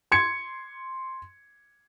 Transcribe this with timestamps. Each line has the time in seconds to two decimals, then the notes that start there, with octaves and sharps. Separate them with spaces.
0.12 C6 G#6 C#7